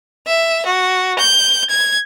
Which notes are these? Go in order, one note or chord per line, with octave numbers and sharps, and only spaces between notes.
E5
F#4
G6
G#6